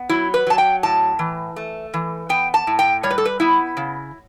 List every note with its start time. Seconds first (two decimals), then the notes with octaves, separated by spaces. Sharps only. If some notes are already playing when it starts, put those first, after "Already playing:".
Already playing: B3
0.09 F#3 E4
0.34 B4
0.47 F#3 A5
0.58 G5
0.83 A2 A5
1.19 E3
1.56 A3
1.94 E3
2.29 B3 G5
2.54 A5
2.67 A2
2.79 G5
3.03 G3 C#5
3.10 B4
3.18 A4
3.25 B4
3.40 B3 E4
3.77 C#3